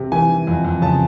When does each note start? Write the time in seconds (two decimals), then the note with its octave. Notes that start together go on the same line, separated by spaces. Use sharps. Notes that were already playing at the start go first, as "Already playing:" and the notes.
Already playing: C3
0.12 E3 G#5
0.30 E3
0.47 F2
0.65 F2
0.82 C#3 A5